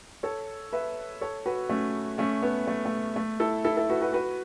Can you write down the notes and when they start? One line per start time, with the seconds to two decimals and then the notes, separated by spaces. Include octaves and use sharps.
0.23 A4 C#5
0.73 B4 E5
1.21 A4 C#5
1.46 F#4 B4
1.70 A3 C#4
2.18 A3 C#4
2.42 B3
2.67 A3
2.86 A3
3.16 A3
3.40 E4 A4
3.65 E4 A4
3.77 E4 A4
3.90 F#4 B4
4.02 F#4 B4
4.13 F#4 B4